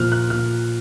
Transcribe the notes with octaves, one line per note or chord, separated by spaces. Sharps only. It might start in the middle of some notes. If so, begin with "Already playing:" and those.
Already playing: A#2 F3 F6 F#6
F#6
A#2 F6